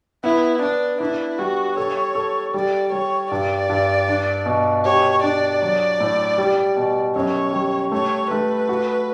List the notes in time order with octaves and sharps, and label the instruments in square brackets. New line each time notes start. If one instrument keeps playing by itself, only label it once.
[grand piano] B3 [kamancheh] E4
[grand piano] B3 [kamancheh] D4
[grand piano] D4 [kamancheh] E4
[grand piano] G3 [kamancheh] F#4
[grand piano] A4 [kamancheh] C#5
[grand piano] A4
[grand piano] G3 [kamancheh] D5
[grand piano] G3 [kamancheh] C#5
[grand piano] G2 [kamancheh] D5
[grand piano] G2
D4
B2
[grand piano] G4 [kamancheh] C#5
[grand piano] D4 [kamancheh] D5
[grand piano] F#3
A2
G3
B2
[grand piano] F#2 [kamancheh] C#5
[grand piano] G3
[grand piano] A3 [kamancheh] C#5
[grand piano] A3 [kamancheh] B4
[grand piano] F#4